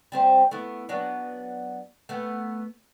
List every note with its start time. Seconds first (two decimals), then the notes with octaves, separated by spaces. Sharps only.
0.12 G3 C4 C5
0.51 A3 B3 E4
0.89 F#3 B3 D4
2.09 A3 B3